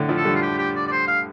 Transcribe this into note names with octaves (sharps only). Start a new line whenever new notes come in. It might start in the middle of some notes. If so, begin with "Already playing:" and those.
Already playing: A2 D3
F3 A3
A4
D3 G3
F4
G4
G4
D5
D5
C5
F5